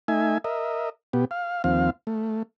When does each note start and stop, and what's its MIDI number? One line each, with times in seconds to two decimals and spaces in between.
0.08 0.38 57
0.08 0.38 63
0.08 0.38 76
0.08 0.38 80
0.44 0.89 70
0.44 0.89 75
0.44 0.89 76
1.13 1.25 47
1.13 1.25 59
1.13 1.25 67
1.31 1.62 77
1.64 1.90 39
1.64 1.90 53
1.64 1.90 60
1.64 1.90 77
2.07 2.43 57